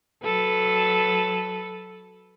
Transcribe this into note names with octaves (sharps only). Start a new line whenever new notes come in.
F#3 A4 B4